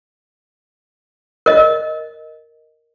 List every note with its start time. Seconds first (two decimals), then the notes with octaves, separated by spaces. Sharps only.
1.46 A#4 D#5